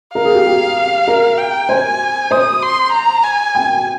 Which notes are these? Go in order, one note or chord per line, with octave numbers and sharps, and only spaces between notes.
A#4 F5
G#4
G4
G4
A#4
G5
C5 G#5
C5 D#6
C6
A#5
G#5
G5